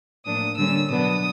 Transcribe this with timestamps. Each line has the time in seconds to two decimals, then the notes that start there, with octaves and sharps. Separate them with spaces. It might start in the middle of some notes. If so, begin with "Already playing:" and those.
0.25 A2 F3 A#3 D4 D#6
0.57 D3 G3 A#3 C#4 E6
0.89 B2 F#3 B3 D4 D#6